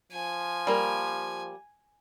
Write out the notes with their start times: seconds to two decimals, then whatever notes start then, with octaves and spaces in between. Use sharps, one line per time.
0.12 F3 G#5
0.67 G3 A#3